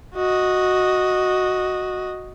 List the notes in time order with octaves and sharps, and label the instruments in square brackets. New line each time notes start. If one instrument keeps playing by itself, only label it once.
[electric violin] F#4 D#5